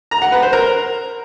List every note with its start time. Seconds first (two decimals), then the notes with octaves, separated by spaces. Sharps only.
0.11 A#5
0.22 F#5
0.32 B4
0.42 C5
0.53 A#4